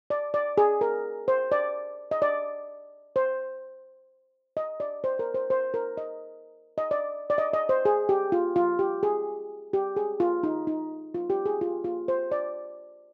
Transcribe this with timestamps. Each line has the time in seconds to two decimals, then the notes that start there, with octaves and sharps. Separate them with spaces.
0.10 D5
0.34 D5
0.58 G#4
0.81 A#4
1.28 C5
1.52 D5
2.11 D#5
2.22 D5
3.16 C5
4.57 D#5
4.80 D5
5.04 C5
5.19 A#4
5.34 C5
5.50 C5
5.74 A#4
5.97 D#5
6.78 D#5
6.91 D5
7.30 D5
7.38 D#5
7.53 D#5
7.69 C5
7.85 G#4
8.09 G4
8.32 F4
8.56 F4
8.79 G4
9.03 G#4
9.73 G4
9.96 G#4
10.20 F4
10.43 D#4
10.67 D#4
11.14 F4
11.30 G4
11.46 G#4
11.61 F4
11.84 F4
12.08 C5
12.31 D5